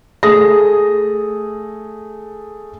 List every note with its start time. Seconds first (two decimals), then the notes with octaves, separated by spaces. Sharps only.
0.23 A3 G#4 D#6 A#6